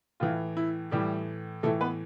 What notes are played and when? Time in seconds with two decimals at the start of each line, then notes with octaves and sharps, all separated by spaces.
0.20 A2 E3 F4
0.57 E4
0.91 A2 E3 G3 G4
1.63 A2 E3 A3 A4
1.81 B3 B4